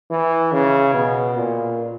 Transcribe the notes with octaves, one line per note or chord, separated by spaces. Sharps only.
E3
C#3
B2
A#2